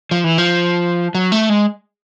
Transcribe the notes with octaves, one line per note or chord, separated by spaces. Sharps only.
F3
E3
F3
F#3
A3
G#3